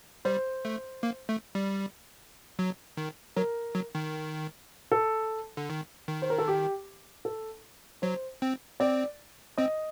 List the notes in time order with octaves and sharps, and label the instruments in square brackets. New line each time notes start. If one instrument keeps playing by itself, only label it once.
[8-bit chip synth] G3 [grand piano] C5
[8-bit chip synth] A3
A#3
A3
G3
F#3
D#3
[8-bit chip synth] F#3 [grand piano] A#4
[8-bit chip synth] F#3
D#3
[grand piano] A4
[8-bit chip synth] D3
D#3
D#3
[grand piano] C5
A#4
A4
G4
A4
[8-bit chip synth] F#3 [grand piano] C5
[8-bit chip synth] C4
[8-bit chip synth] C4 [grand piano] D5
[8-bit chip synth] C4 [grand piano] D#5